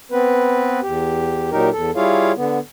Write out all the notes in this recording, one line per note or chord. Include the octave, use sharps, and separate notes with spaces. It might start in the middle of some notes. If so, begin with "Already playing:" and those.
B3 C4 B4
E2 G4
A#2 F#3 D#4 G4 A#4
E2 A4
G3 E4 F4 G#4 C#5 F5
D3 B3